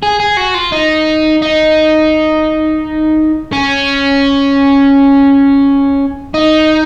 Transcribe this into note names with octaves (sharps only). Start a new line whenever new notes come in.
G#4
G#4
F#4
F4
D#4
D#4
C#4
D#4